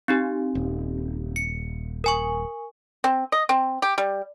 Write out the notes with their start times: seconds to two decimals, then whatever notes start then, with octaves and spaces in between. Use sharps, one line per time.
0.08 C4 D#4 G4
0.55 D#1
1.36 C#7
2.04 A#4 G#5 C#6
3.04 C4
3.32 D#5
3.49 C4
3.82 G4
3.98 G3